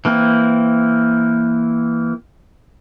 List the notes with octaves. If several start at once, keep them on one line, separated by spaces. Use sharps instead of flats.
E3 A#3 C4